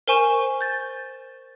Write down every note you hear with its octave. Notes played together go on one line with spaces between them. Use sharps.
A#4 C5 G#5 C#6 E7
G6 A6